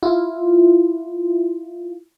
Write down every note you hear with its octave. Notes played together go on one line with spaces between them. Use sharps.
E4 F4